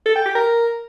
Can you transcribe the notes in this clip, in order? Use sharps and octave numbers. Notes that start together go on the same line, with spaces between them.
A4
G5
G4
A#4